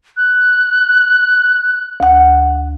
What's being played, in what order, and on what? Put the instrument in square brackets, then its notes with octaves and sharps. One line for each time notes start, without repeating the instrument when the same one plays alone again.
[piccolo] F#6
[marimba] D2 F#5